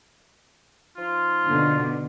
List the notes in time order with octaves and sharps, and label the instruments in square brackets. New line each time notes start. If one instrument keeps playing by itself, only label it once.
[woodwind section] F3 D#4 F4
[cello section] B2 D3